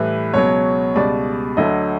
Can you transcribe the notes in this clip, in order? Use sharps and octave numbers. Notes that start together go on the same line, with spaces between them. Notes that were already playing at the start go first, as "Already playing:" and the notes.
Already playing: A2 E3 G3 B4
C#2 B2 F#3 C#5
C#2 B2 G3 D5
D2 D3 F#3 D#5